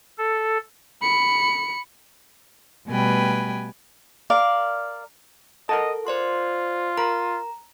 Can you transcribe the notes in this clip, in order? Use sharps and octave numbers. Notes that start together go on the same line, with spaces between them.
A4
B5 C#7
B2 G3 A3 B4 G5 G#5
A#4 D5 F5
A4 A#4 D#5 F#5 A5
F4 C5 D5 C6
A#4 A#5 B5